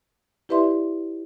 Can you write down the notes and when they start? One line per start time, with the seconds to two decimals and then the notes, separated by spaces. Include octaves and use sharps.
0.49 E4 G4 B4 D5 E5 C6